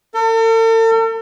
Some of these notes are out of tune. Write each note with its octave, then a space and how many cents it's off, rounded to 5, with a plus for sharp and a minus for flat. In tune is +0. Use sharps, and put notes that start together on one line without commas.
A4 +45